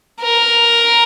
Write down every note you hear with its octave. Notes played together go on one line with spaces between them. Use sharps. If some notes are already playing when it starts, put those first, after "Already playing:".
A#4